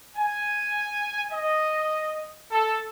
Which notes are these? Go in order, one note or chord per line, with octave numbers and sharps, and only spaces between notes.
G#5
D#5
A4